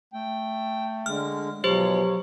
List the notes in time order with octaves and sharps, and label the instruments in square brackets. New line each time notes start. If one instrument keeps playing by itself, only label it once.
[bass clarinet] A3 [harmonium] G5
[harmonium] D3 G#3 [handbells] F6
[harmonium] B2 F3 C#5 [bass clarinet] F#3 [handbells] G4 C5